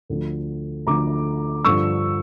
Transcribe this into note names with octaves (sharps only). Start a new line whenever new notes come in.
D2 D3 F3
D2 D3 F3 A#5 D6
G2 D3 F3 C#6 E6